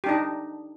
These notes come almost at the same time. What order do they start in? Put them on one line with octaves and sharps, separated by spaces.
G4 D4 D#4